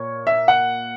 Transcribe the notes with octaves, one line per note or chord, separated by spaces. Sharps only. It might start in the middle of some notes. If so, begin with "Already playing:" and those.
Already playing: A#2 A#3 C#5
E5
F#5